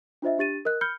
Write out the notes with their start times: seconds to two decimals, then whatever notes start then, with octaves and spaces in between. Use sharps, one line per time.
0.22 D4 F4 C5 D#5 E5
0.38 D4 G4 A6 D#7
0.65 A#4 D#5 F#6
0.81 B5 F6 G6 C#7 G7